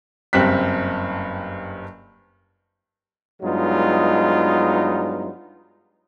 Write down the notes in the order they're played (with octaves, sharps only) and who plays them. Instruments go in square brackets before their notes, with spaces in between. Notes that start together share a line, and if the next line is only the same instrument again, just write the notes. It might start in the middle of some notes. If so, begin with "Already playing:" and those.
[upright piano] F#1 G2 C4 F#6 B6
[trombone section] G2 F#3 G#3 B3 D#4 F4